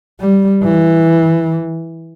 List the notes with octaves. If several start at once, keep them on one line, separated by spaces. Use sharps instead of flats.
G3
E3